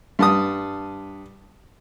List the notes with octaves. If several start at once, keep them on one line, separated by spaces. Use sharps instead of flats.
G2 A5 D#6